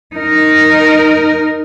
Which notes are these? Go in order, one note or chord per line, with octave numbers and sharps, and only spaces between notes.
D#4 A#4